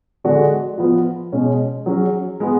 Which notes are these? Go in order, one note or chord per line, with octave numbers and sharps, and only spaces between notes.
D3 G#3 D4 F#4
F3 B3 F4
B2 G#3 C#4
F#3 C#4 G#4
G#3 B3